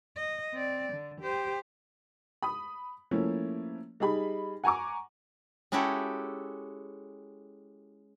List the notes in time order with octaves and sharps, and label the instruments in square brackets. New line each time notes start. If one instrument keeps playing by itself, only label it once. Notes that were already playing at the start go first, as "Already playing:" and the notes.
[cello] D#5
C4 D5
D3
G4 C5
[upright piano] B5 D#6
F3 A3 A#3 C#4 E4
G3 D#4 G#4 B5
F#5 G#5 A#5 C#6 D6
[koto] G#3 C#4 E4 F#4 G4 A4